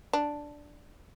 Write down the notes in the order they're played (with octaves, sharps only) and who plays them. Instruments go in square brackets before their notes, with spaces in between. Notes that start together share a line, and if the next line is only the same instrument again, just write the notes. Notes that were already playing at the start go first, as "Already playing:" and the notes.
[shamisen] D4